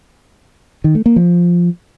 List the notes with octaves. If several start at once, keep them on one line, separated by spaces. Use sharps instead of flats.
D#3
A3
A#3
F3